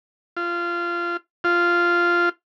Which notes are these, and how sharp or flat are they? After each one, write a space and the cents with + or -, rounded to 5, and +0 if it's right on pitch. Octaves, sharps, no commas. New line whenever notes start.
F4 -20
F4 -10